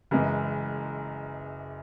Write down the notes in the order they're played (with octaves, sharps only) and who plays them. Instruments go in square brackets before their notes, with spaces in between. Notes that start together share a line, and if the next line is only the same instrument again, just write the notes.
[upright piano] F#1 F#2 E3 G#3